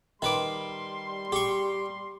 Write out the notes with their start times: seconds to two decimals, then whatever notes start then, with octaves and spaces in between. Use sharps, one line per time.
0.22 D#3 G3 B4 C6 D6
1.32 G4 C#6